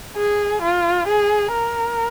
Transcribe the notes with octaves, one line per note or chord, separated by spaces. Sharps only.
G#4
F4
G#4
A#4